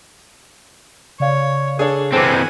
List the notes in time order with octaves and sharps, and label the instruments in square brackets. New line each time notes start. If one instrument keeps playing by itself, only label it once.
[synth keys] C#3 D5 F5 [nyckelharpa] C#5
[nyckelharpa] D4 [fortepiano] G#4 A4 C#5
[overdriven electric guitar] E3 C4 [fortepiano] A4 D6 [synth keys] C5 [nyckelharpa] F#5 G#5